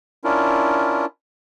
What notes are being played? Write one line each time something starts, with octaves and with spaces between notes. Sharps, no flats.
C#4 D4 E4 F4 A#4